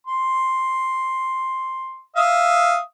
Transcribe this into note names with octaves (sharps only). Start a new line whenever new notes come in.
C6
E5 F5 D#6